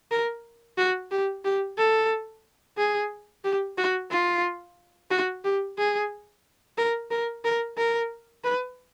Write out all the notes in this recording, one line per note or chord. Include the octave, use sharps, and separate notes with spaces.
A#4
F#4
G4
G4
A4
G#4
G4
F#4
F4
F#4
G4
G#4
A#4
A#4
A#4
A#4
B4